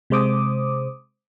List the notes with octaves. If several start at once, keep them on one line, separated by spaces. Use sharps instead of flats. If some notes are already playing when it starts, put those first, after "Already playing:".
C3 G#3 C5 D6 D#6